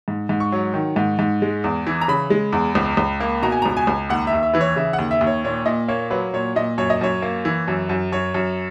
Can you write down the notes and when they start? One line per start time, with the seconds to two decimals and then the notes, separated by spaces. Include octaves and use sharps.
0.08 G#2
0.29 G#2
0.40 C#6
0.52 F#3
0.74 D#3
0.96 G#2
1.19 G#2
1.42 G#3
1.64 E2
1.87 E3
2.01 A#5
2.08 C#3 B5
2.30 G#3
2.53 E2
2.75 C#2
2.97 C#2
3.20 A#3
3.42 B2 A#5
3.52 G#5
3.62 C#2 A#5
3.77 G#5
3.87 C#2
4.09 D#2 F#5
4.27 E5
4.33 D#2
4.43 E5
4.54 E3 B4
4.61 C#5
4.76 C#3 E5
4.93 F#5
4.99 D#2
5.11 E5
5.21 D#2
5.27 C#5
5.44 A#2 C#5
5.66 A#2 D#5
5.88 A#3 C#5
6.10 F#3 B4
6.33 A#2 C#5
6.56 A#2 D#5
6.78 F#2 C#5
6.90 D#5
7.01 F#2 C#5
7.22 A#3
7.45 E3
7.68 F#2
7.89 F#2
8.12 F#2 C#5
8.34 F#2